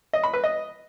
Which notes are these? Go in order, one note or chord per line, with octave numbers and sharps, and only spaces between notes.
D#5
B5
B4
D#5